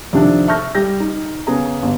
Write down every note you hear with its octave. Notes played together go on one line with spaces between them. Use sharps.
F2 C3 D#3 D4
E5 A5 C#6 F6 G6 A#6
G3 G6 A#6
D#4
C#3 B3 G#4 A#5
G1